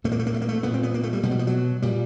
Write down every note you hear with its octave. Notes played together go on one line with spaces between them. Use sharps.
A#2 A3
A#3
A3
A#3
A3
A#3
A3
A#2 B3
C4
B3
A#3
A3
G3
B2 G3
F#3
F3
F#3
A#2 G3